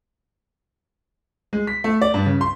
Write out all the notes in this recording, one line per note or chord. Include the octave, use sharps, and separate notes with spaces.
G#3
B6
A3
D5
G2
C#3
C6